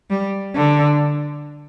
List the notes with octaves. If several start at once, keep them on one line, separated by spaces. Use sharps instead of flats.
G3
D3